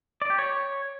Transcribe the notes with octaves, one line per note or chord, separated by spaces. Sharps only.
D5
G4
C#5